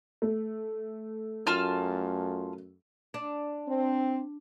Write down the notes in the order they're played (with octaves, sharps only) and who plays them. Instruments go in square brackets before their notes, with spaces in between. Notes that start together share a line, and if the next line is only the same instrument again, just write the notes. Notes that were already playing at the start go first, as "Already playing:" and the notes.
[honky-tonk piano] A3
[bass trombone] F#2 [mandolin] F4 A5 F6
[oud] D4
[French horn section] C4